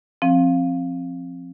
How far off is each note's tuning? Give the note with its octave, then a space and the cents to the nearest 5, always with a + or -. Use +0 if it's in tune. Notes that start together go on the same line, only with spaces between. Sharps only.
F3 +0 C4 +20